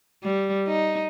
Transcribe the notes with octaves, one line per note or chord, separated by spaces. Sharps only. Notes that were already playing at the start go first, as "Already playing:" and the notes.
G3
D#4